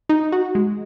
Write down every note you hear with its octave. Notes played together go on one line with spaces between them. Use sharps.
D#4
F#4
G#3